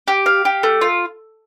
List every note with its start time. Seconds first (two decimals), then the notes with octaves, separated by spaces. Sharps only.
0.08 G4
0.26 F5
0.45 G4
0.63 A3
0.81 F4